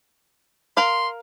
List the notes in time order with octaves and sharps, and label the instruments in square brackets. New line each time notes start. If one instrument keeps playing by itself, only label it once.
[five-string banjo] A#4 F5 [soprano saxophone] C6